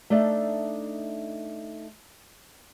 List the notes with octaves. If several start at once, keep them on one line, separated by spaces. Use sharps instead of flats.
A3 D4 D#4 D5 E5 A5